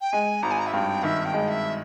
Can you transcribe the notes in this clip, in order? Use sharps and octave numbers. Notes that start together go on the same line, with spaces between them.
G5
G#3 G#5
G#1 A#5
G#5
A#5
E5
G2 G5
D#3 E5
G5
G#3
E5